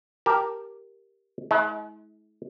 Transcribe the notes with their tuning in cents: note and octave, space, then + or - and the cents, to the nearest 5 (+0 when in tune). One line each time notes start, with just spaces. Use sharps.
G4 +0 A#4 +0 A5 +0
G#3 +40 E4 -35